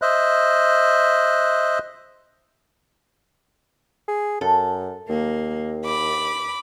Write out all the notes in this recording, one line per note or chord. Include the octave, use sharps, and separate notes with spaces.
C5 D#5 E5 F#6
G#4
F#2 A4
D#2 A#3
B5 D6